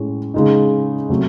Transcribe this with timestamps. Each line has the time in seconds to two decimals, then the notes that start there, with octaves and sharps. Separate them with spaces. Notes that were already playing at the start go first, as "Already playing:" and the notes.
Already playing: A2 G#3 C#4 E4
0.34 C#3 G#3 D#4
1.09 C3 F#3 A3